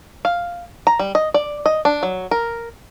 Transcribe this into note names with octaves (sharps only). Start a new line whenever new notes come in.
F5
A#5
G3
D#5
D5
D#5
D4
F#3
A#4